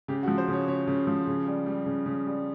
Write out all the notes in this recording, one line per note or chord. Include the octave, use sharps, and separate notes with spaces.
C#3 G4
F#4
F3
C5
C#3 C#5
C#3 C#5
C#3
F3
C#3
G3
G3
C#3
C#3
G3